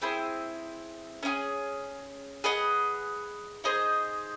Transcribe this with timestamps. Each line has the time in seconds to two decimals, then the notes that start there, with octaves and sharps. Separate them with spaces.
0.02 C4 E4 G#4 C5
1.23 C#4 E4 G#4
2.44 G#4 B4 D#5 F#5
3.64 D#4 G#4 C5 D#5